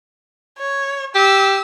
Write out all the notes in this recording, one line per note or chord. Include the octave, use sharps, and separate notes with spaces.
C#5
G4 E6